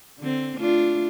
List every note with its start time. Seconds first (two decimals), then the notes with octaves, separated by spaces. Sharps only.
0.19 D3 C4
0.59 A3 D4 F4